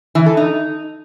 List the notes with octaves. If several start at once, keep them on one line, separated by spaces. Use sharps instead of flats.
E3
A4
D#4